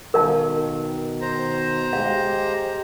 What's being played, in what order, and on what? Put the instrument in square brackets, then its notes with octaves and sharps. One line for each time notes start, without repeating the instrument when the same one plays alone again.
[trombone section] B2 D#3 [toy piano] A#4 F5 A5
[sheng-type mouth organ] C5 A#5
[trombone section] G#3 G4 [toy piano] F5